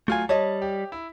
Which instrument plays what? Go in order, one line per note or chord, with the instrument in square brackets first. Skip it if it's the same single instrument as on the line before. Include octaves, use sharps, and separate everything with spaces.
[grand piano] F#3 F4 [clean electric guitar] A3 G#5
[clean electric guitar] G3 [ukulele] C#5 D#5 [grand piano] A5
[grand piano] G4
E4